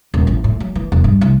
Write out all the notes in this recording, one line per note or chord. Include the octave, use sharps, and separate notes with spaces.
D#1
A1
A2
F#3
E3
E1
G2
C2